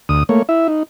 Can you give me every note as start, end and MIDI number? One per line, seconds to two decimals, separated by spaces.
0.09 0.23 38
0.09 0.23 87
0.29 0.42 57
0.29 0.42 58
0.29 0.42 73
0.49 0.67 64
0.49 0.67 76
0.68 0.83 63